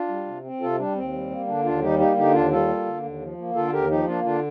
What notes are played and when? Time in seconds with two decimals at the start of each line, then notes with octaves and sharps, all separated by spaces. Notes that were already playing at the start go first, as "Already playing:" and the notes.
Already playing: D4 F4
0.08 G3
0.26 C3
0.44 C4
0.60 C3 F4 A4
0.78 G3 D4
0.95 D#2 C4
1.12 G3
1.30 A#3
1.47 D3 D4
1.64 D#2 D4 F4
1.81 G3 D#4 G4
1.99 A#3 D#4 G4
2.16 D3 D#4 G4
2.34 D#2 D4 F4
2.51 G3 F4 A4
2.68 A#3
2.86 D3
3.03 D#2
3.20 F3
3.38 A#3
3.55 D3 F4 A4
3.72 D#2 G4 A#4
3.90 F3 D#4 G4
4.07 A#3 D4 F4
4.24 D3 D4 F4